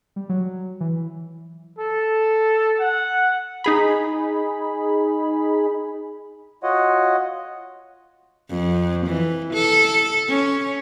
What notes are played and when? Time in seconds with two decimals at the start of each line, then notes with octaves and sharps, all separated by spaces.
0.16 G3
0.29 F#3
0.81 E3
1.79 A4
2.80 F#5
3.64 D#4 G#4 B5
6.63 F4 F#4 C#5 D#5 F#5
8.50 F2
9.06 E3
9.53 A4
10.28 C#4